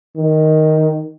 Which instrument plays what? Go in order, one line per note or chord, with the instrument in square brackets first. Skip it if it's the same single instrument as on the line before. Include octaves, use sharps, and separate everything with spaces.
[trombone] D#3